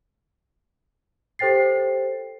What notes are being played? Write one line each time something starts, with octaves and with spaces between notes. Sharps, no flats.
G4 A4 C5 G5 A6 C7